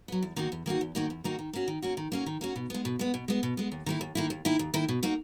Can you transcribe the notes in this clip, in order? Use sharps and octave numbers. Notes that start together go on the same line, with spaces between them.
F#3 B3
E2
D#3 A#3 D#4 F#4
E2
D#3 A#3 D#4 F#4
E2
D#3 A#3 D#4 F#4
E2
D#3 A#3 D#4 F#4
D#3
A#3 C#4 F#4
D#3
A#3 C#4 F#4
D#3
A#3 C#4 F#4
D#3
A#3 C#4 F#4
B2
G#3 B3
B2
G#3 B3
B2
G#3 B3
B2
G#3 B3
D#2
D#3 A#3 E4
D#2
D#3 A#3 E4
D#2
D#3 A#3 E4
D#2
D#3 A#3 E4
B2
A#3 D#4 F#4